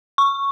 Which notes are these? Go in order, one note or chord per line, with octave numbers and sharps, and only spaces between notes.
C#6